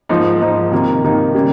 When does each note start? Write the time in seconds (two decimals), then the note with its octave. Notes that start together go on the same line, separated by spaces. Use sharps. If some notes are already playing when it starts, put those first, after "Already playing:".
0.09 G#2 F3 A#3 D#4
0.41 G#2 F3 A#3 D#4
0.72 C3 D#3 A#3 D#4
1.04 C3 D#3 A#3 D#4
1.35 C#3 G3 A#3